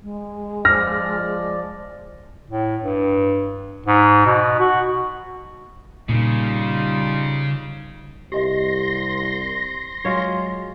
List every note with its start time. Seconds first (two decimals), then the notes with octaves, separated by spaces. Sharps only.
0.03 G#3
0.65 F3 D5 F6 A#6
2.50 A2
2.82 G2
3.86 G#2
4.26 B2
4.60 F#4
6.09 A#2 C#3 G3 D#4 F4
8.32 C2 G4 D#5 E5 C6 A#6
10.05 F#3 G#3 F4 C#5